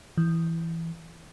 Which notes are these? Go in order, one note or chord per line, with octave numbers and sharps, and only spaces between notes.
E3